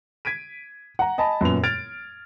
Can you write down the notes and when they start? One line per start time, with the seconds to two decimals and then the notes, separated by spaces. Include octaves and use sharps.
0.25 G#6 B6 D7 D#7
0.99 F#5 A#5
1.18 D#5 G#5 A5 B5
1.41 F#2 A#2 B3 F7
1.63 F6 G#6 A6 D7 F7